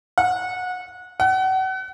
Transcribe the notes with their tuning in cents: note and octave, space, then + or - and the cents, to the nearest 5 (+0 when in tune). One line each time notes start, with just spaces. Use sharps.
F#5 -25
F#5 +35